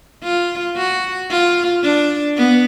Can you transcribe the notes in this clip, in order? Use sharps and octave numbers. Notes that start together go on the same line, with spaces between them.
F4
F#4
F4
D4
B3